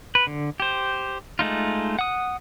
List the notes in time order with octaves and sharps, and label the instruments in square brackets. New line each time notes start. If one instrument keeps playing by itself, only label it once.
[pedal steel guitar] B4
D3
G4 C5
G#3 A3 D#4 F4
F#5 D#6